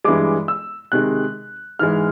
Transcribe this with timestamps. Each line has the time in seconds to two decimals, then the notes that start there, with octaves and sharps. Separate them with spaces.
0.04 G2 E3 G#3 D6
0.48 E6
0.92 C3 D#3 G#3 F#6
1.79 G#2 E3 G#3 F6